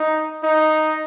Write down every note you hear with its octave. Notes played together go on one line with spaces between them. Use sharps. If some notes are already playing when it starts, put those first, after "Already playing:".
Already playing: D#4
D#4